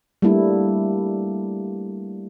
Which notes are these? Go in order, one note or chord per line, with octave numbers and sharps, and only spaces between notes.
G3 A3 A#3 D4 E4